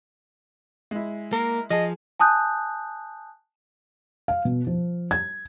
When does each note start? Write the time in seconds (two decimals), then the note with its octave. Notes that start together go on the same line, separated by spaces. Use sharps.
0.91 G#3 E4
1.33 A#3 A#4
1.70 F3 G#4 D#5 A5
2.20 G#5 A5 D#6 F#6 G6
4.28 F5
4.45 B2
4.67 F3
5.11 G#6